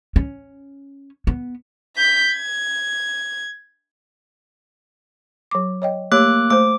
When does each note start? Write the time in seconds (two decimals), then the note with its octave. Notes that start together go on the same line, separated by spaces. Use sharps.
0.16 C#4
1.27 B3
1.97 G6 B6
2.33 G#6
5.51 F#3 D6
5.82 C#5 D#5 G5
6.12 A3 A#3 G4 C#5 D6 F#6
6.50 A3 C5 D6